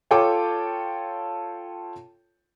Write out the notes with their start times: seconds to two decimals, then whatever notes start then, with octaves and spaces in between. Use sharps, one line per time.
0.11 F4 A4 C#5 G5 A5 D6